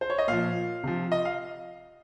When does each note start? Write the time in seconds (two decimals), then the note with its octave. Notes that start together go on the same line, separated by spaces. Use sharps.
0.01 C5
0.10 C#5
0.18 D#5
0.28 A#2 F3 F5
0.83 C3 F3
1.12 D#5
1.25 F5